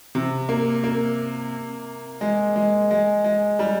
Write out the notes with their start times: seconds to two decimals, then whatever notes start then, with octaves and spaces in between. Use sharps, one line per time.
0.15 C3
0.49 A#3
0.84 A#3
2.21 G#3
2.56 G#3
2.91 G#3
3.24 G#3
3.59 G3